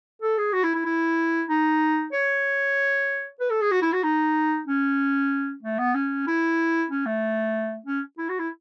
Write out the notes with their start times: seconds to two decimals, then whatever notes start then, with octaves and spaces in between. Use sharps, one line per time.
0.21 A4
0.38 G#4
0.53 F#4
0.63 E4
0.75 E4
0.85 E4
1.48 D#4
2.12 C#5
3.40 B4
3.50 A4
3.61 G#4
3.71 F#4
3.82 E4
3.92 F#4
4.03 D#4
4.67 C#4
5.63 A3
5.78 B3
5.94 C#4
6.27 E4
6.90 C#4
7.06 A3
7.86 C#4
8.18 E4
8.29 F#4
8.39 E4